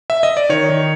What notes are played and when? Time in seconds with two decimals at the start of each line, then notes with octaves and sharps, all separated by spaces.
0.10 E5
0.23 D#5
0.37 D5
0.49 D#3 C#5
0.70 D#3